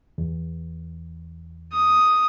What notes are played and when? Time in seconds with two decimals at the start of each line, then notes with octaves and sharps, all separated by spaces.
0.18 E2
1.72 D#6